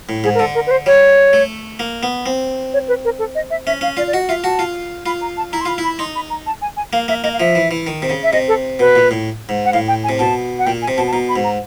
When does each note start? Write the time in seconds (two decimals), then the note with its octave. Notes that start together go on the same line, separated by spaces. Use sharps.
0.09 A2
0.24 G#2 G#4
0.35 A#4
0.39 D3 A4
0.55 A#4
0.67 B4
0.71 C5
0.86 G3 C#5
1.33 A3
1.79 A#3
2.03 B3
2.26 C4
2.73 C#5
2.88 B4
3.05 A#4
3.19 A4
3.35 D#5
3.50 E5
3.67 C#4 E5
3.81 C#4 F5
3.97 F4 D5
4.07 D5
4.13 F#4 D#5
4.29 F4 E5
4.44 F#4 A5
4.59 F4
5.06 F4 B5
5.22 A#5
5.37 A5
5.53 E4 A#5
5.61 C6
5.66 F4 B5
5.78 E4
5.84 B5
5.99 D#4 C6
6.16 B5
6.30 A#5
6.47 A5
6.62 G#5
6.77 G#5
6.93 A#3 F5
7.08 A#3 E5
7.23 A#3 D#5
7.33 F5
7.40 F3 E5
7.55 E3
7.71 E3
7.87 D#3
8.02 C3
8.10 C#3
8.23 E5
8.33 C3 D#5
8.48 A4
8.79 B2 B4
8.96 A#2
9.11 A2
9.49 G#2
9.65 F#5
9.73 A2 F5
9.88 G5
10.04 G#5
10.09 C3
10.19 B2 A5
10.59 F#5
10.66 A#2 G5
10.82 G#5
10.88 C3
10.97 B2 A5
11.07 A5
11.12 B2 A#5
11.29 B5
11.36 G#2
11.44 A#5